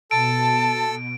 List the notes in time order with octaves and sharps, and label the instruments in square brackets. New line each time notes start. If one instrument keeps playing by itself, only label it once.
[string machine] B2 [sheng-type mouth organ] A4 E6 [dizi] A5 [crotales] D7